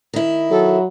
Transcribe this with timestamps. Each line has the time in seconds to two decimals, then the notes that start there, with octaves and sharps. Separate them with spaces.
0.14 D#3 E4
0.50 F#3 A4